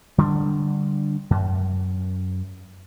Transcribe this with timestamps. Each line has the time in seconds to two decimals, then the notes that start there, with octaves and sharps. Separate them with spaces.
0.18 D3 G3 D4
1.31 F#2